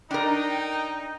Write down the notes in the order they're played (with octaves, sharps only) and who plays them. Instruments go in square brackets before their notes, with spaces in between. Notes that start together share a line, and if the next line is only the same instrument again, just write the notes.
[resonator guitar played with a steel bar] D4 A#4 [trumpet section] D#4 [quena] G5